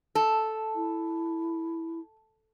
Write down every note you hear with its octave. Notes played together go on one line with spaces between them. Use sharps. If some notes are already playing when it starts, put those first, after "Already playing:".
A4
E4